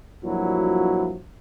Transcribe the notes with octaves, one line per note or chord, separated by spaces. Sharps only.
G2 A#2 F3 F#3 E4 F#4